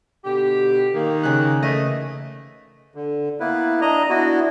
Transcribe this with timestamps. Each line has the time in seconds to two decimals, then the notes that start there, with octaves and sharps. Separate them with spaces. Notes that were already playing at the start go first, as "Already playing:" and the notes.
0.25 B2 D3 G4
0.94 D#3 A#3
1.23 C#3 F#6
1.63 E3 A3 D#5
2.95 D3
3.40 A#3 B3 E4 B4
3.81 D4 D#5 A#5
4.10 B3 D4 E4 F#4